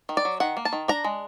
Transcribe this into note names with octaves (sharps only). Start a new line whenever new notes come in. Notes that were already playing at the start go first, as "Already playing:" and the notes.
D#3
D5
F#3
D#3 F#5
A#3
A5
D#3
D4 A#5
G#3